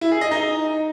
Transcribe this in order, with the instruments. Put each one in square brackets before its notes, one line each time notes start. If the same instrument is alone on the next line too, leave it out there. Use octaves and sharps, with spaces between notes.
[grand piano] E4
G#4
D#5
D#4